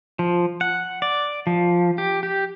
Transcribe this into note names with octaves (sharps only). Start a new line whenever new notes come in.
F3
F#5
D5
F3
G4
G4